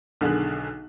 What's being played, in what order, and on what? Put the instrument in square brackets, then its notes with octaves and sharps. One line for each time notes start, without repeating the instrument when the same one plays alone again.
[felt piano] B1 D3 D#3 G#4 F#6